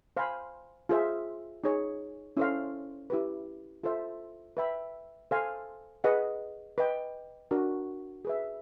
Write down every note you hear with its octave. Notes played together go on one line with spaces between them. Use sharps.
C5 F5 G#5 B5
F4 G#4 C5 E5
D#4 G#4 C#5
C#4 E4 A4 C5 F5
E4 G4 B4
F4 A4 C5 E5
B4 E5 G5 B5
A4 C5 F5 G#5
G#4 B4 D#5 F#5
B4 D#5 G5
D4 F#4 A#4
G#4 B4 E5